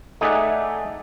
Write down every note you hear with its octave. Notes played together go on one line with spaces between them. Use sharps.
A3 D#4 G#4 D5 E5 F#5